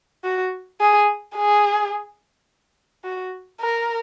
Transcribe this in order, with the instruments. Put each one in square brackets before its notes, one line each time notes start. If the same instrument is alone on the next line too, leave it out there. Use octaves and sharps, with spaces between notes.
[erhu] F#4
G#4
G#4
F#4
A#4